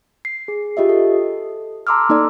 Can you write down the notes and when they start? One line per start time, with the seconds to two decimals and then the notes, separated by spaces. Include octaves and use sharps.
0.25 C7
0.48 G#4
0.77 F4 G4 D#5 E5
0.89 A4
1.87 A5 A#5 C6 D6 E6 F6
2.09 A#3 D#4 A4 D5